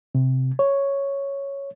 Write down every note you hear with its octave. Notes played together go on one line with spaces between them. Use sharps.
C3
C#5